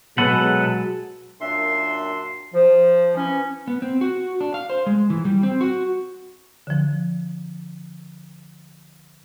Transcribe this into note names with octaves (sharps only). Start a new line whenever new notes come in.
B2 F#3 G#3 B3 A4 B4 F#5
F#2 A#2 D4 E5 C6
F3
E3 C#4
B3
C4
F#4
D4
F5
C5
G#3
E3
G3
C4
F#4
D3 F3